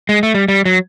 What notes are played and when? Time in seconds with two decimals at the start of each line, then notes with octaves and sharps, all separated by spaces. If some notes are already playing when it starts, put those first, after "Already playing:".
0.09 G#3
0.23 A3
0.34 G3
0.48 G3
0.65 F#3